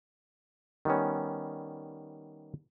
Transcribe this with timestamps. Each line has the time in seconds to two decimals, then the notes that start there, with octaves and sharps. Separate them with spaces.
0.85 D#3 G3 B3 C#4